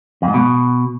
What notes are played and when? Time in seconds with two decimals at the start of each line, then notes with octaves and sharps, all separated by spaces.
0.22 F2
0.28 G#2
0.34 B2